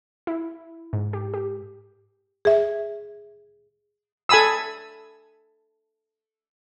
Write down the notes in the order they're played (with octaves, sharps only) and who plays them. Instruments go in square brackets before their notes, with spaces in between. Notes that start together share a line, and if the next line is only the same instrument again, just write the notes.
[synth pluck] E4
G#2
G4
G4
[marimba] G#4 E5
[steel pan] A4 G#5 B5 D#6 E6